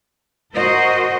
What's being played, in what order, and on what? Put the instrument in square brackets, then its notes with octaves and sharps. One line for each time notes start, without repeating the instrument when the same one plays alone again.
[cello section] F#4 A#4 C5 D#5